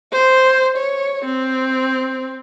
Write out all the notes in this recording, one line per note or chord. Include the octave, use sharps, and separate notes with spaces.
C5
C#5
C4